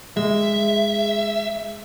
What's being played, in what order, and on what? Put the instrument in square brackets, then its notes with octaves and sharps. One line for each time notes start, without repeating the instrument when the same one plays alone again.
[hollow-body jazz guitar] G#3 [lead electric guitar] E5